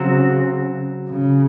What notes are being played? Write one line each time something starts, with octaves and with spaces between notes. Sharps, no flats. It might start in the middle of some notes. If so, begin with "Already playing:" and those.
Already playing: C#3 F#3 C4 F#4
C#3